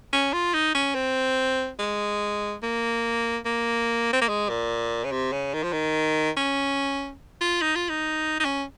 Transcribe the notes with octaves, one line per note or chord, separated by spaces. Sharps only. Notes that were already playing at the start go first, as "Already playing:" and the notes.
C#4
F4
D#4
C#4
C4
G#3
A#3
A#3
C4
A#3
G#3
A#2
C#3
C3
C#3
D#3
F3
D#3
C#4
F4
D#4
F4
D#4
D#4
C#4